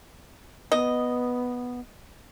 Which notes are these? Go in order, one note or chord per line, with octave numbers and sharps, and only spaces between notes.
B3 D#5